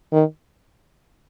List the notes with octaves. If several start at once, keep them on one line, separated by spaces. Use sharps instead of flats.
D#3